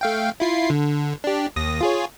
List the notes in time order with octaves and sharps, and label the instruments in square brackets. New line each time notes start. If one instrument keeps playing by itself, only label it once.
[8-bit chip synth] A3 F5 G5
E4 F4 C7
D3
D4 G4
D#2 D#6 A#6
F4 G#4 C#5